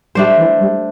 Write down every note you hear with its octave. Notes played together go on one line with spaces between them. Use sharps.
G3 A3 D4 C5
E3
G3